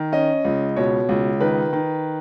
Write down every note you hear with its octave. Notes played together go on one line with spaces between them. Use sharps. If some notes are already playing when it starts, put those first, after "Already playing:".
Already playing: D#3
C#4 D#5
C#2
B2 C#5
C#2
D#3 B4
D#3